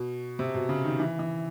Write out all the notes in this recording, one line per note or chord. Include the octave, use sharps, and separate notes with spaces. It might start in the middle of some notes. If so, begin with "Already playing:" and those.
Already playing: B2
C3
B2
C#3
D#3
E3
E3